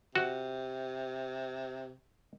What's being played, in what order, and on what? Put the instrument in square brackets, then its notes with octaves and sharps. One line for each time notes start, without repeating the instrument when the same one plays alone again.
[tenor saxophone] C3 [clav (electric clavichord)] F#4